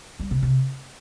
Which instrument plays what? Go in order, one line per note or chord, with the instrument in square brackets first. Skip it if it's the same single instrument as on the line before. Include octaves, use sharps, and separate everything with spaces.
[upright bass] G3
C3
C3